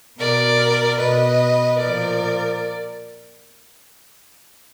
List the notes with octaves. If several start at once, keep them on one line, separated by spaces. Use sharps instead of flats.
B2 A#4 D5
B2 B4 D#5
A#2 F3 A#4 D5